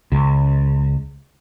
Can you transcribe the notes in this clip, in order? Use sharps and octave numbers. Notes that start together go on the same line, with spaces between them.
C#2